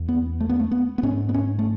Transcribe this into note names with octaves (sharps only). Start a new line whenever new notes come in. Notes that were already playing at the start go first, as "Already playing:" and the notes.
Already playing: E2
B3
A3
B3
A3
B3
B3
G#2 C#4
B3
C#4
A3